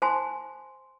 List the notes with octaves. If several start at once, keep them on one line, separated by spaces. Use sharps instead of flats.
C5 G#5 A5 C6